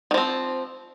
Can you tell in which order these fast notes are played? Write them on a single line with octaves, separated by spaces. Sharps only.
D#3 F3 C4